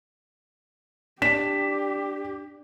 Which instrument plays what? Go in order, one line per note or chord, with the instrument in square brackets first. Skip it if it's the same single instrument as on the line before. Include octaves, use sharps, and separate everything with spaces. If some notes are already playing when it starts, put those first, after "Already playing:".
[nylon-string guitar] D4 [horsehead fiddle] G4 [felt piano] B6 E7